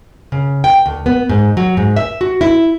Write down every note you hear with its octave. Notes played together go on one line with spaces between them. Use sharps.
C#3
G5
D2
B3
G#2
F#3
G#2
E5
F#4
E4